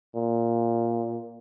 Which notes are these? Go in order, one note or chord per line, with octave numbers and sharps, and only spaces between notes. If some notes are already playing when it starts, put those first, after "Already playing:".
A#2